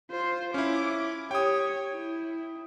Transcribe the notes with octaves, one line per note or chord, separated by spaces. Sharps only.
F4 C5
C#4 E4 D6
G4 C#5 G5 D#6
E4